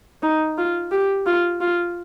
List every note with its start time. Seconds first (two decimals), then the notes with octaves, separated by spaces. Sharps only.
0.23 D#4
0.58 F4
0.92 G4
1.26 F4
1.61 F4